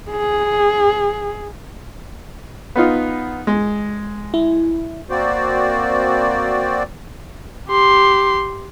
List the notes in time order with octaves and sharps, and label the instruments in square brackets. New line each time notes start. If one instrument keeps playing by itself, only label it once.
[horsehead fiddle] G#4
[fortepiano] B3 D#4 F4
G#3
[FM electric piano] E4
[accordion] A#3 C4 F#4 C5 D5
[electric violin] G4 C6